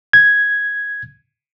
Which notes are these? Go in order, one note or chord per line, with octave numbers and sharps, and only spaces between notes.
G#6